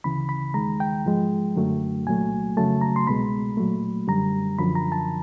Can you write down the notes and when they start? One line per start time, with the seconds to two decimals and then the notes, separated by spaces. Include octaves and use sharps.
0.04 D2 C#3 E3 B5
0.29 B5
0.54 D#2 D#3 G#3 A#5
0.80 G5
1.05 G#2 F3 G#3
1.56 F#2 D3 F#3 A3
2.06 C2 A#2 F#3 A3 G#5
2.57 F2 C#3 F#3 A3 A5
2.81 A#5
2.96 C6
3.07 C2 B2 G#3 B5
3.57 A#2 F#3 A3
4.08 F#2 D3 G3 A#5
4.58 F#2 D3 F3 B5
4.75 A#5
4.92 A5